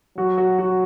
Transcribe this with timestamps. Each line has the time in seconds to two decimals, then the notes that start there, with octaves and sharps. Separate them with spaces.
0.18 F#3 F#4
0.38 F#4
0.59 F#4